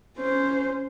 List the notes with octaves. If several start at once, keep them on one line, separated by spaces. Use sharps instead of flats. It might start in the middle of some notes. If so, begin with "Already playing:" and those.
C#4 C5